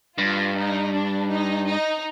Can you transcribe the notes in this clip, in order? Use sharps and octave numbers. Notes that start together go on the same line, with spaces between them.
G2 F4
D#4
D4
D#4
D#4